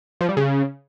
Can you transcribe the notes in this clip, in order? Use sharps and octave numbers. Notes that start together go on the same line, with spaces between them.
F3
G3
C#3